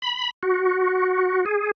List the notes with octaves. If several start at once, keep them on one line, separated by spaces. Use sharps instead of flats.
B5
F#4
G#4